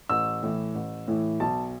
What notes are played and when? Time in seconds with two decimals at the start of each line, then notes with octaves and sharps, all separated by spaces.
0.09 A1 E6
0.43 A2 E3
0.75 A1
1.08 A2 E3
1.40 B1 A5